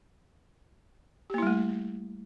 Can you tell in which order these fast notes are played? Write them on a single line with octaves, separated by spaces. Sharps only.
G4 A#3 E4 G3 A3